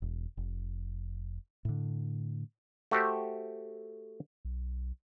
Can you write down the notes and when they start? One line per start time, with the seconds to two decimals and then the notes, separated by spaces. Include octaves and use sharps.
0.02 E1
0.37 F1
1.65 A2 D3
2.91 A3 F#4 G4 C5 E5
4.45 B1